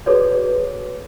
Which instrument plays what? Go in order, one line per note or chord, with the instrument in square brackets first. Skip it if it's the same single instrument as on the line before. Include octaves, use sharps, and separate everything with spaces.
[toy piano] F#4 G#4 A4 B4 C#5 D5